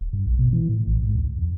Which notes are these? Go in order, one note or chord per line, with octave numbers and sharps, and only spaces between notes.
D#1
G2
A#1
B2
E3
A2
A1
G#2
D2
F2